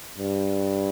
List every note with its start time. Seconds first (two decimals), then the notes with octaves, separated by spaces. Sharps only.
0.18 G2